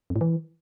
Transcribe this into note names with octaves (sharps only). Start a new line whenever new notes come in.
F2
A2
E3